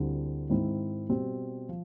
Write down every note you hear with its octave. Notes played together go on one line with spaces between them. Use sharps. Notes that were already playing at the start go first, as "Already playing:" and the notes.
Already playing: D2 D3 G3 C4 E4
G#2 D#3 G#3 C4 E4
B2 G3 C4
F3